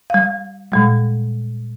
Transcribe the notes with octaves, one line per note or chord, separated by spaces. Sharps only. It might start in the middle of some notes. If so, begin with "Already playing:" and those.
G3 F5
A#2 G3 G#3